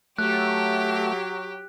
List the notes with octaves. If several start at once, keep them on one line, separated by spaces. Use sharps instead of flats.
F#3 A3 G4 F#6